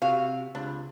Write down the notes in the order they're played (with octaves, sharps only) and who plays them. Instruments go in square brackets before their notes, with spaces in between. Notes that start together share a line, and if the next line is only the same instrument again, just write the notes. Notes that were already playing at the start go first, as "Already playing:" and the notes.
[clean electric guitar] C3 [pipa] F#4 F5
[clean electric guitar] C#2 [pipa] D4